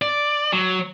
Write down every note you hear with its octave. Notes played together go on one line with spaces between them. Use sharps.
D5
F#3